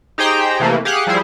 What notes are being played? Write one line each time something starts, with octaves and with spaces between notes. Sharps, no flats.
D#4 G4 G#4 C5 G5 A#5
C3 E3 A3 A#3
G4 G#4 F5 F#5 F#6
F3 G3 E4 G#4 C5